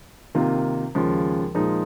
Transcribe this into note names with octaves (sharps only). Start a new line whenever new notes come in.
C3 D#3 A#3 F4
D#2 C#3 F3 G#3
A#2 F3 G#3 D#4